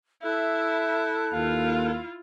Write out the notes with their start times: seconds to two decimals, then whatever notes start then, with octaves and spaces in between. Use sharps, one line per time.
0.23 E4 A4 E5 F#6
1.33 D#2 A#3 E4 F4 F5